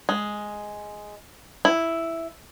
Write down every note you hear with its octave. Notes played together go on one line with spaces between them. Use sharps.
G#3
E4